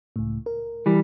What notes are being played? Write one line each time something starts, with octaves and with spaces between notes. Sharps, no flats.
C#2 A2
A#4
E3 G3